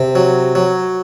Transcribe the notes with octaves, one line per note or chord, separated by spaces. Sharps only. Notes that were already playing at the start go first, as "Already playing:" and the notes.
Already playing: C3
F#3
F#3